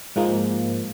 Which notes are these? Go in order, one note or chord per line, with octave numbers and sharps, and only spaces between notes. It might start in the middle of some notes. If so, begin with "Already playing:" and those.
G#2 F3 G#3 A#3